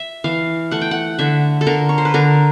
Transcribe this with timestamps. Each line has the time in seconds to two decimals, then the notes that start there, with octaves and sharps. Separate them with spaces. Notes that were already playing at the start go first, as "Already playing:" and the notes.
Already playing: E5
0.24 E3 F5
0.71 A3 F#5
0.81 G5
0.91 F#5
1.19 D3 E5
1.61 A4
1.67 D3 A#4
1.89 C#5
1.98 C5
2.05 B4
2.14 D3 A#4